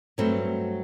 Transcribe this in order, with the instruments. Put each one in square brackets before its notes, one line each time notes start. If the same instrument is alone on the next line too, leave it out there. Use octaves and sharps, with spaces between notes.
[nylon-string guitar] G2 F#3 A3 C4